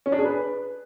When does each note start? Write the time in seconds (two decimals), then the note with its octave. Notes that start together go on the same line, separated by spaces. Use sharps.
0.06 C#4
0.12 D4
0.19 G#4
0.25 B4